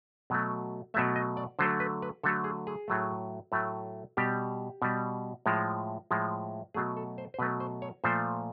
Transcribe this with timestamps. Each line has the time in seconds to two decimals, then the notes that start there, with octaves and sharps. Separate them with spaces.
0.30 B2 F#3 A3
0.94 B2 F#3 A3 E5
1.16 D#5
1.37 D5
1.59 D3 F#3 A3 C5
1.80 B4
2.02 B4
2.23 D3 F#3 A3 A4
2.44 G#4
2.67 G#4
2.88 A2 F#3 A3
3.52 A2 F#3 A3
4.17 B2 G3 G4
4.82 B2 G3
5.46 A2 F3 G#3
6.11 A2 F3 G#3
6.74 B2 F#3 A3 G#4
6.97 A4
7.18 C5
7.34 C5
7.39 B2 F#3 A3 B4
7.60 C5
7.82 C#5
8.04 A#2 F3 A3 C5